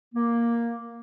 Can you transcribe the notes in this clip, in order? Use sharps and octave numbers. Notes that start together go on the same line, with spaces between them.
A#3